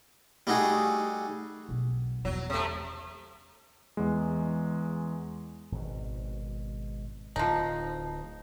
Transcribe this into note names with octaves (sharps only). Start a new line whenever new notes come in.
G3 A3 D#4 F#4 G#4
B1
E2 D3 F#3
C3 A3
E2 G#3
G#1 B2
D1 F3 D#4